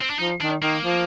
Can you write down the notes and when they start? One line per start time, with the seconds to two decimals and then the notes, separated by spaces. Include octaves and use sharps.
0.01 C4
0.10 D4
0.19 F3 D#4
0.41 D#3 D4
0.62 D#3 A#3
0.84 F3